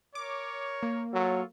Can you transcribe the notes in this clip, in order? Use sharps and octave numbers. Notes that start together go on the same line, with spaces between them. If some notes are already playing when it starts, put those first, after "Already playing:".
A#4 C#5 D6
A#3
F#3 F4 A4 C#5